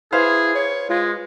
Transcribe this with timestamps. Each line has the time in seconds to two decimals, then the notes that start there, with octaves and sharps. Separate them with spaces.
0.12 E4 G#4 B4 C5 F5
0.55 C#5
0.90 G#3 F4